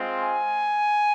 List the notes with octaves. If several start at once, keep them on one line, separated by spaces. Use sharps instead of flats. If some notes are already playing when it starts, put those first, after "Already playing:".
Already playing: G#3 C4 F4
G#5